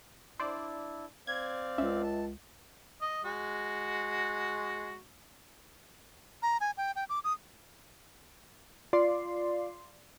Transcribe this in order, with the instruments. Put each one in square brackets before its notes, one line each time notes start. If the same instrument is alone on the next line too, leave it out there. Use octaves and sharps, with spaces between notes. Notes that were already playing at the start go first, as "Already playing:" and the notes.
[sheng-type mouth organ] D4 E4 [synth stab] C5 D5
[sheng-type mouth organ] C4 D5 F5 [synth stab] G#6
[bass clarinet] C#2 [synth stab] C#4 E5
[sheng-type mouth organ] A5
[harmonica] D#5
G#3 F#4
[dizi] A#5
G#5
G5
G5
D6
D#6
[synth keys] F4 D5 C6